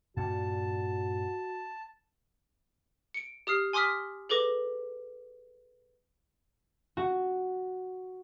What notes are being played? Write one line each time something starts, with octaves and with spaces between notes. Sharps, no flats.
G2 A#2 F#4 A5
C#7 D7
G4 D#6 F6 C7
G#5 C6 D6 D#6 F6 B6
G#4 A4 B4 D6 A#6
F#4